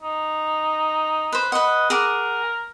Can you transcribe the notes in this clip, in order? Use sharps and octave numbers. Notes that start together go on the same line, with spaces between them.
D#4
B4 C5
B4 D#5 F#5
G#4 A#4 F#5 D6